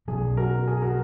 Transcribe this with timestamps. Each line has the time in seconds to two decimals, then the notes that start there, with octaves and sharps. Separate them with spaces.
0.08 B2 F#3 C#4 G#4
0.37 F#4 A#4
0.67 G#4
0.82 F#4 A#4